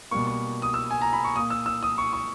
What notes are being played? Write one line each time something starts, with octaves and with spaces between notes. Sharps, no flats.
B2 G3 A#3 C#6
C#6
D#6
E6
G#5
A#5
B5
C#6
A#2 A#3 D#6
E6
E6
D#6
C#6
C#6